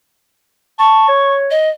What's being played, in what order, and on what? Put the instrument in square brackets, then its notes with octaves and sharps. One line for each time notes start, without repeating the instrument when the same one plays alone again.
[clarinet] A5 [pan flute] C#6
[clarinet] C#5
[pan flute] D#5